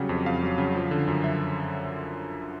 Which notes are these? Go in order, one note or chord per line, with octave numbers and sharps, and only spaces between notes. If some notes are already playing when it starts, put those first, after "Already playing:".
Already playing: C#3 F#3 G3 F#5
F2
F2 F5
F#3
C#3
F3
D3
F#2
E5